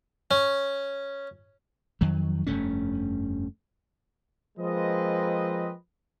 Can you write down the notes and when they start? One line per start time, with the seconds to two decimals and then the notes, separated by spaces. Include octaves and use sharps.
0.31 C#4
2.01 F2 D#3 F#3
2.47 F1 G2 A3 C#4
4.58 F3 G#3 A#3 C4 B4 D#5